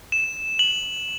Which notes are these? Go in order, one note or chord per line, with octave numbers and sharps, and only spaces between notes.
E7
F#7